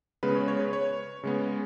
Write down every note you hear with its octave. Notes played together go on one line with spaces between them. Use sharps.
C#3 G#3 B3 B4
C#5
C#5
B4
C#5
C#3 G#3 B3